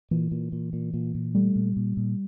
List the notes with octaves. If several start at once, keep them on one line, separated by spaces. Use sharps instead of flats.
A#2 E3
A#2
A#2
A#2
A#2
A#2
G3 A3
A#2
A#2
A#2